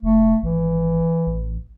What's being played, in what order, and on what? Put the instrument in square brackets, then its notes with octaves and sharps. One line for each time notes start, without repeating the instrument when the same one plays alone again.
[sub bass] F1 [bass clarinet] A3
[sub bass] G#1 [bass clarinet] E3
[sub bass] A1